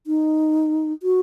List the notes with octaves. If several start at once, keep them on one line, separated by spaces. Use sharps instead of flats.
D#4
F#4